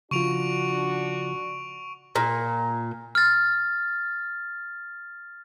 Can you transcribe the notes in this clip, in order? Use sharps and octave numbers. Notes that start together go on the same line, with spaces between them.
C#3 F3 D4 F4 F#4 C#6 D7 F7
A#2
F6 A6